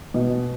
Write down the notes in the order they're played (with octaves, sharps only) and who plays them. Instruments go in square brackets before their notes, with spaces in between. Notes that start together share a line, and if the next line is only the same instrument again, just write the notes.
[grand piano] B2